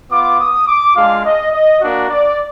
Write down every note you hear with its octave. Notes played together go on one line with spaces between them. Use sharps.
B3 F4 D6
D#6
D6
G#3 D4 F4 F5
D#5
D#5
A#3 D4 F#4
D5